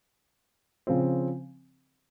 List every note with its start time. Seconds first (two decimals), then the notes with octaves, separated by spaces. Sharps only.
0.87 C#3 F3 C4